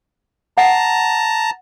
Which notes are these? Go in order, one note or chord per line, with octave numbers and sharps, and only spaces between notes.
F#5 A5 A#5